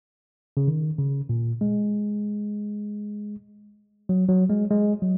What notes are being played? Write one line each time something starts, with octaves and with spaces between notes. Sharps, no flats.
C#3
D#3
C#3
A#2
G#3
F#3
F#3
G#3
G#3
F#3